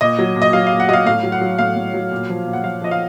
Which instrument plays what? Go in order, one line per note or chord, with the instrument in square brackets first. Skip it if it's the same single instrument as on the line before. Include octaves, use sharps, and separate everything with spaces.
[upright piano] A#2 D#5
F#3
A#2
D#5
F#3 F5
A#2 F5
F#5
F#3 D#5
F5
A2 F5
F#3
F#5
F#3
A2 F5
A2
F#3
A#2
F3
A#2
F#5
F3 F5
F3 D#5
F5